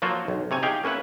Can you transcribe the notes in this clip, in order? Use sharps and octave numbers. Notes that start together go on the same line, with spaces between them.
F3 F#3 A#3 F4 F#4 C5
B1
C3 C#5 G#5
D#4 G4 G#4 F5 G5
A#3 C#4 B4 E5 F#5